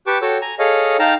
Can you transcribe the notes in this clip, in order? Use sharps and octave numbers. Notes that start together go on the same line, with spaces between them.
G4 B4 G5 A5 C#6 D6
F#4 A4 C#5 G5 E6
G#5 A#5
G#4 A4 C#5 D#5 F5
D#4 F5 G5 A5 A#5